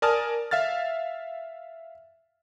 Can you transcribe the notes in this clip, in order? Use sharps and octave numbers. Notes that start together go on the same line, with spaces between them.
A#4 D5 G#5 A5 D#6 F6
E5 F5 F6 A6